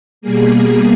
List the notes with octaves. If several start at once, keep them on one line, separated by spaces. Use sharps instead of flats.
B2 G3 A#3 G#4